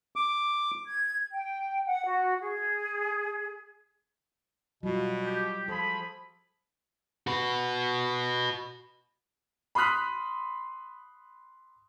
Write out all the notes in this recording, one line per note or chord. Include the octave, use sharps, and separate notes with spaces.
D6
G#6
G5
F#5
F#4
G#4
B2 F#3 G3 F4
G4
F3 G#4 A4 B5
F#4 B4
B5 C6 D#6 F6 F#6 B6